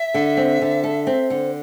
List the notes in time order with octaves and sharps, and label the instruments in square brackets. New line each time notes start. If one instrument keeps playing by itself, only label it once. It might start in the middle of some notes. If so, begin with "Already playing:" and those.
Already playing: [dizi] E5
[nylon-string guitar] D3
C4
D3
A4
C4
D3